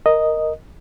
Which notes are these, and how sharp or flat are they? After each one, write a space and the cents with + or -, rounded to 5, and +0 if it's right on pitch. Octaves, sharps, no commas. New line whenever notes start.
A#4 +0 D#5 +0